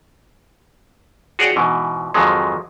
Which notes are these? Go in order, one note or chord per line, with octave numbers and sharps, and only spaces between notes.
F#4 G#4 C#5 D5 F#5 G5
G#2 B2 E3
F2 G#2 D#3 F3 F#3 G#3